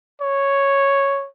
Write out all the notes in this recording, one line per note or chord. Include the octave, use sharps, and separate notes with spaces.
C#5